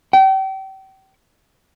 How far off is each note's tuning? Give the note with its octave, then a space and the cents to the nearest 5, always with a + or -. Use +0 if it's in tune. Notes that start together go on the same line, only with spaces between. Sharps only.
G5 -35